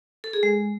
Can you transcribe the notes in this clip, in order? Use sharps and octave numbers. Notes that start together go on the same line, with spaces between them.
A4
G#4
G#3